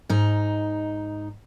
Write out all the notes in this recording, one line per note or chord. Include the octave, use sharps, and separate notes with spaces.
G#2 D#4